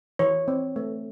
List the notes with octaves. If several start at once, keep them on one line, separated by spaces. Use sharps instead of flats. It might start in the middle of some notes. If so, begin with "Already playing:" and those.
E3 C#5
C4
A3